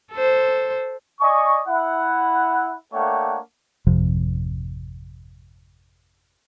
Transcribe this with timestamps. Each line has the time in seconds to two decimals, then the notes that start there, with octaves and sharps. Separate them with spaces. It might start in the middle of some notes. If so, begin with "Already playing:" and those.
0.12 A4 C5
1.21 D5 D#5 G#5 C#6
1.68 E4 F#5
2.94 A3 A#3 D4 C#5 F#5 G5
3.87 G#1 F2 C3 F3